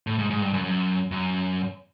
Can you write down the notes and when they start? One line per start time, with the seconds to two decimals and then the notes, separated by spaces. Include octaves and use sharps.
0.07 A2
0.18 G#2
0.30 G#2
0.42 G2
0.54 F#2
0.65 F#2
1.11 F#2